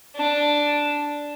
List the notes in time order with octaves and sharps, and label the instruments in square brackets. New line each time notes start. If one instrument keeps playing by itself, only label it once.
[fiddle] D4